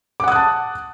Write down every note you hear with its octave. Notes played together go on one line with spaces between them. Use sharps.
F#5 A5 D6 D#6 F#6